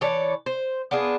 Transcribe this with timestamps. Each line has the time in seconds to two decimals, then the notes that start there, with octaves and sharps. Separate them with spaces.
0.01 E3 A4 C#5 D5
0.46 C5
0.91 B3 D4 F4 G#4